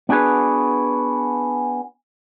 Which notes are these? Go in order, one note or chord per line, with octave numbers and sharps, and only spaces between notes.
B3 D4 F#4 G#4 B4